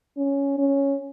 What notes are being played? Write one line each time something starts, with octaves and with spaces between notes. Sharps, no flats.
C#4
C#4